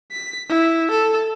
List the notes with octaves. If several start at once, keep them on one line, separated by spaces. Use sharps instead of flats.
B6
E4
A4